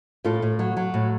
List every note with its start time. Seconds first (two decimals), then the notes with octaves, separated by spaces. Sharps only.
0.25 A2 F4 A4
0.42 A2
0.59 F#3
0.77 F#3
0.94 A2